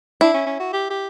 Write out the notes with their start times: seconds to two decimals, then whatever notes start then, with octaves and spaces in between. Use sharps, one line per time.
0.21 D4 E4
0.34 C#4
0.46 C#4
0.60 F#4
0.73 G4
0.90 G4